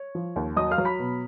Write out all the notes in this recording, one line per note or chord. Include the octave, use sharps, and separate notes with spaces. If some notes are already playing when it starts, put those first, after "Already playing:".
Already playing: C#5
F3
D#2
F#3 D#5 D#6
F5 F6
F#3
B5 B6
B2